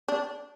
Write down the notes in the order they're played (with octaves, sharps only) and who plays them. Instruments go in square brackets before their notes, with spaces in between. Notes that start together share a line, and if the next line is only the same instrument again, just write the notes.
[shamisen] D4